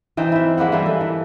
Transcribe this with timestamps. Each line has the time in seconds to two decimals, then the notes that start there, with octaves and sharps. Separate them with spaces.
0.17 E3 C4 D#4
0.32 E4 E5
0.57 G#3 A#3 B3 F#5
0.72 E3 G3 A#3 E4
0.86 A4
1.01 E3